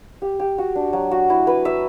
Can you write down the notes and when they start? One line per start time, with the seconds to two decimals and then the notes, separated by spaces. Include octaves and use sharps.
0.22 G4
0.39 G4
0.58 F#4
0.75 D4
0.93 F#3
1.11 F#4
1.30 E4
1.47 B4
1.65 E5